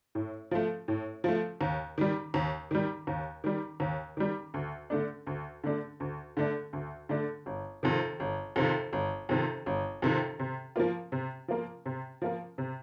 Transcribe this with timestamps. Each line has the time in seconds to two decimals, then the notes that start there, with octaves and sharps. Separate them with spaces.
0.15 A2
0.51 F3 A3
0.88 A2
1.24 F3 A3
1.61 D#2
1.98 D#3 G3
2.34 D#2
2.71 D#3 G3
3.07 D#2
3.44 D#3 G3
3.80 D#2
4.17 D#3 G3
4.54 D2
4.90 D3 A3 D4
5.27 D2
5.64 D3 A3 D4
6.00 D2
6.37 D3 A3 D4
6.73 D2
7.09 D3 A3 D4
7.46 G1
7.83 F2 C3 D#3
8.20 G1
8.56 F2 C3 D#3
8.93 G1
9.29 F2 C3 D#3
9.66 G1
10.02 F2 C3 D#3
10.39 C3
10.76 F3 A#3 F4
11.12 C3
11.48 F3 A#3 F4
11.86 C3
12.22 F3 A#3 F4
12.58 C3